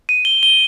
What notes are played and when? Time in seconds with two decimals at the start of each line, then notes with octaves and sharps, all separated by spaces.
0.09 D#7
0.25 G7
0.43 G7